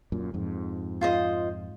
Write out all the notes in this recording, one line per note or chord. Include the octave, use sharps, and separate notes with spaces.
F#2 A#2
F2 G#2
F4 C5 D#5